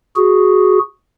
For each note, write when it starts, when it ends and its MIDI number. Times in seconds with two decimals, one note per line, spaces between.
0.17 0.79 66
0.17 0.79 68